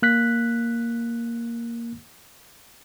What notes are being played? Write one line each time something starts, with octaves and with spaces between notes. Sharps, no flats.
A#3 F#6 B6